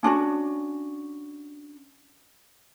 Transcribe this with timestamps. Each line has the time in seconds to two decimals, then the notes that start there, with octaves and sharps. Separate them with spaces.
0.03 C#4 D4 F4 F#4